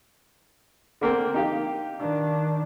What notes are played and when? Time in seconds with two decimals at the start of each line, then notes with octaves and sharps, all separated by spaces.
1.01 D3 A#3 C4
1.34 D#4 G4 F5
1.99 D#3 D4